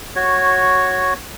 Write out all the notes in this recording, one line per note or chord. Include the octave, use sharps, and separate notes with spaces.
F#4 C#5